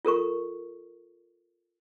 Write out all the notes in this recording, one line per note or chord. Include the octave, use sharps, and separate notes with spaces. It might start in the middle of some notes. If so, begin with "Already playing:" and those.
F4 A4 A#4 C#6